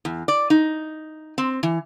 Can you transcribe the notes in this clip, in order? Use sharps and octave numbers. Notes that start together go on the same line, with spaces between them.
E2
D5
D#4
C4
E3